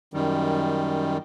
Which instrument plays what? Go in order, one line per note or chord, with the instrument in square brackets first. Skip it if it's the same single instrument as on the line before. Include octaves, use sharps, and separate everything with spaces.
[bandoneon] F#2 D#3 G3